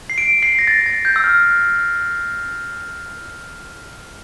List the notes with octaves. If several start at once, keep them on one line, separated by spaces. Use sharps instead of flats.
C7
D7
C7
A#6
A6
A6
G6
E6
F6